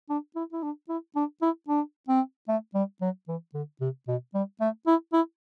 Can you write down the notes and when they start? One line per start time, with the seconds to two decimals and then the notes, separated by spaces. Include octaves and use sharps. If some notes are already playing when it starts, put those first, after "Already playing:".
0.10 D4
0.36 E4
0.53 E4
0.63 D4
0.89 E4
1.16 D4
1.42 E4
1.69 D4
2.09 C4
2.49 A3
2.75 G3
3.01 F#3
3.28 E3
3.54 D3
3.81 C3
4.08 B2
4.34 G3
4.61 A3
4.87 E4
5.13 E4